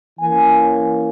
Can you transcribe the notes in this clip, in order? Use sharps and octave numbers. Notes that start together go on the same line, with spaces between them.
E3 A#3 C#4 G#5